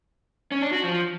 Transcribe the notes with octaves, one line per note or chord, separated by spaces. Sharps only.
C#4
D4
F#4
F3